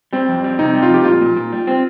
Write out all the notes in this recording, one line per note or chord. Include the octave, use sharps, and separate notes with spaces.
G3 C4
F2
G3
C3 D#4
G3
F4
F2 G4
A#2 F4
A#2
A#2
G3
C4